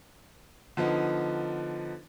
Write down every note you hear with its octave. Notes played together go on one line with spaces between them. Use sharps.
D3 F3 B3 D#4